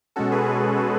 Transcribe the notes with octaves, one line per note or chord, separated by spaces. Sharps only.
B2 G#3 C#4 F#4 A4
G#4 B4
G#4 B4
F#4 A4